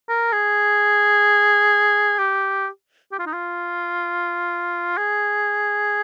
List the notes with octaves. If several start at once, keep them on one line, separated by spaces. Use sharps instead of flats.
A#4
G#4
G4
G4
F4
D#4
F4
G#4